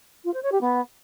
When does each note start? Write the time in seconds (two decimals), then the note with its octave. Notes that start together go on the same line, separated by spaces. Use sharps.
0.25 F4
0.34 C5
0.43 C#5
0.52 G4
0.61 B3